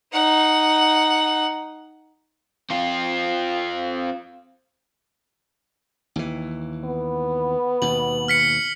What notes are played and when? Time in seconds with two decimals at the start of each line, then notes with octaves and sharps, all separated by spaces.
0.13 D#4 F#5
2.70 C4 F4
6.16 D#2 E3
6.85 B3
7.82 D#2 B2 F#7
8.28 F6 B6 C#7